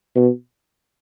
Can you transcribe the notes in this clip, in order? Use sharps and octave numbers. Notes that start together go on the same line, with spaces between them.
B2